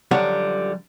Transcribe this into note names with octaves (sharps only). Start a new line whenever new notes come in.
F#2 D3 F3 G3 C#5 F#5